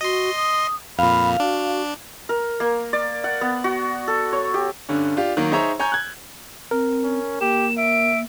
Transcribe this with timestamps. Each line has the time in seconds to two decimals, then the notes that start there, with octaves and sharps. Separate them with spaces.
0.01 F#4 D#5 C6
0.36 D#6
0.99 F2 A#2 F5 B5
1.40 D4 F#4
2.29 A#4
2.60 A#3
2.93 D5
3.24 F#5
3.41 B3
3.64 F#4
4.08 A4
4.33 C#5
4.54 G4
4.89 G2 D3 C#4
5.16 D4 F4 G4
5.37 D#3 F#3 A#3
5.52 D#4 G#4 C5 C#5 E5 A#5
5.80 C#5 G#5 A#5 G6
5.92 F#6 G#6
6.71 C4 A#4
7.04 C#4
7.41 A#3 G4 E7
7.78 E5 D7